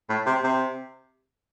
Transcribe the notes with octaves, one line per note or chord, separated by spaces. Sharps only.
A2
C3
C3